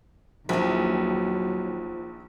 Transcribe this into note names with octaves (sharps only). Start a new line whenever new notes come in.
A#1 D#2 F3 F#3 B3